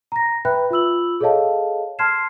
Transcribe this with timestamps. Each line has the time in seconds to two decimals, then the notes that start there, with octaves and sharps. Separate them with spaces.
0.12 A#5 A#6
0.45 B4 E5 G5 B5 F#6
0.70 F4 B5 E6 F#7
1.21 G#4 A4 C#5 D#5 F5 A5
1.99 A5 C6 F6 G#6 C7 E7